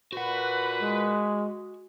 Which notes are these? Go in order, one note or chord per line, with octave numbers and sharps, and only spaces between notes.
A#2 F#4 B4 F#5
G#3